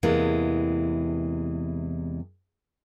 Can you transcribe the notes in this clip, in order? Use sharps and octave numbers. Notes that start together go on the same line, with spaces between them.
E2 C3 E3 G#3 A#3